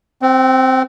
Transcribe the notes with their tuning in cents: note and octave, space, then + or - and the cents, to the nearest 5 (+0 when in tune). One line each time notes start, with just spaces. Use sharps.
C4 +0 G5 -45